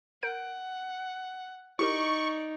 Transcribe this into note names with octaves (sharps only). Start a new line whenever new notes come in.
A#4 F#5 G6 D7
D#4 E4 G4 A#4 D5 C#6